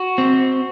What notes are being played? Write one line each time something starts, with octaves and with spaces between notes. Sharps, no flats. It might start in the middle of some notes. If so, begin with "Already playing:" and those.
Already playing: F#4
C4